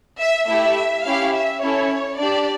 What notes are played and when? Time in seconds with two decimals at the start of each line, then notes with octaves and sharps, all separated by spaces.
0.19 E5
0.47 A3 E4 G4 E5
1.04 C#4 E4 G4 F5
1.34 E5
1.62 C#4 E4 A4 C#5
2.19 D4 G4 D5